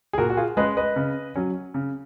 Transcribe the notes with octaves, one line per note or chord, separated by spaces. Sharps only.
G#4
A#2 F#4 A#4
F#4
F4 G#4
G#3 C#4 B4 D#5
B4 D#5
C#3
F#3 C#4
C#3